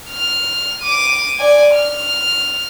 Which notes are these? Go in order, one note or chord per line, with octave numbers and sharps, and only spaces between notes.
F6
D6 D#7
D5 G#5
F6